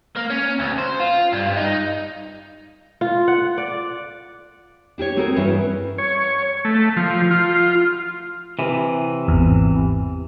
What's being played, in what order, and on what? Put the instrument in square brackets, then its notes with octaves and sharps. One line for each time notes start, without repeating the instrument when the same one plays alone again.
[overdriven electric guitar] A#3
C#4
D2
C5
F4
G2
D#4
[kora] F4
F#5
D5
[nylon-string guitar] D4 G4 G#4 C#5
A3 C4 F#4 G#4 A#4
G2 E3 C#4 C#5
[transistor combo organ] C#5
A3
F3
F4
[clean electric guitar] C3 E3
[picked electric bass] G#1 E2